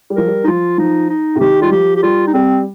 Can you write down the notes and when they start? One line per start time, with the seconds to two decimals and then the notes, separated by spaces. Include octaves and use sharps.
0.10 G3
0.16 F3 A#4
0.27 G3
0.44 D#4
0.47 F3 F4
0.78 F3 D#4
1.10 D#4
1.35 C3
1.40 D#3 G4
1.61 G3 F4
1.72 F3 G4
1.96 G4
2.03 G3 F4
2.28 D#4
2.34 G3 C4